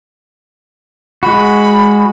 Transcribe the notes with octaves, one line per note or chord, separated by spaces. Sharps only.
G#3 F#4 B5